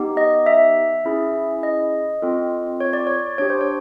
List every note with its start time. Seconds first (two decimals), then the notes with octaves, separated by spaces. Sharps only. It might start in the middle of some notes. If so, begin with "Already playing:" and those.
Already playing: B3 D#4 G4
0.17 D#5
0.46 E5
1.05 C#4 E4 G#4
1.63 D#5
2.22 C4 F4 A4
2.80 C#5
2.93 D5
3.07 C#5
3.38 D4 G4 C#5
3.50 C5
3.61 C#5